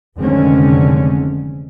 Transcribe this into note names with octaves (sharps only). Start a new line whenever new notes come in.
F1 D3 D#3 G#3 C4 C#4